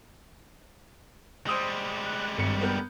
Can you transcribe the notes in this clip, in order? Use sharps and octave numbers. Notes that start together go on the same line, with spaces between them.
G3 G#3 C5 D#6 E6
F#6
G#1 G2 C#7
B3 A#4 G6